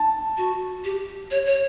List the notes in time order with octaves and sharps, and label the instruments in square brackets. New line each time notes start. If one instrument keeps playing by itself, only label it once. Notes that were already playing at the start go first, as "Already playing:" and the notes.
Already playing: [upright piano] A5
[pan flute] F#4
G4
C#5
C#5